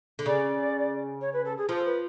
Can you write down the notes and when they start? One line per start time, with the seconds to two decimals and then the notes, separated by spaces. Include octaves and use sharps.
0.19 D3
0.26 C#3 D5
1.21 C#5
1.33 B4
1.45 A4
1.57 G#4
1.68 F3 A4
1.85 B4